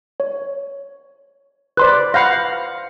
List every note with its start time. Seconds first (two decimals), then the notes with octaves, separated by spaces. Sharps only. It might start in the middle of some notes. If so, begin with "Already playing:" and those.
0.20 C#5
1.77 B4 C5 D5 C6 F#6
2.14 F5 F#5 B5 G6 A#6